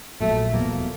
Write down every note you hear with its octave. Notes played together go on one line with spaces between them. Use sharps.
A#1 A#2 F#3 A3
F1 E2 B2 F#3 A#3